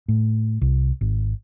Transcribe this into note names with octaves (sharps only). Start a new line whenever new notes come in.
A2
C2
G#1